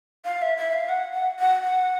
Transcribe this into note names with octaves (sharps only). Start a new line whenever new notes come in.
F5
E5
E5
F5
F#5
F#5
F#5
F#5